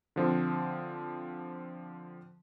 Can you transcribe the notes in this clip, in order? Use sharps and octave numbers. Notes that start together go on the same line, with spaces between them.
D3 F3 C4